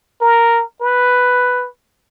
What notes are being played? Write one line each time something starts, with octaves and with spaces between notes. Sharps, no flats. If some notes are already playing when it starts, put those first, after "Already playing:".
A#4
B4